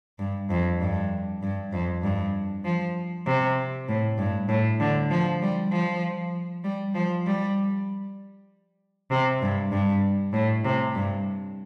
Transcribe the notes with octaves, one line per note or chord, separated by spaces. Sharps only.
G2
F2
G2
G2
F2
G2
F3
C3
A2
G2
A2
D3
F3
G3
F3
G3
F3
G3
C3
G2
G2
A2
C3
G2